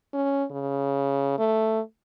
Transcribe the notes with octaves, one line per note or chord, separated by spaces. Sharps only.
C#4
C#3
A3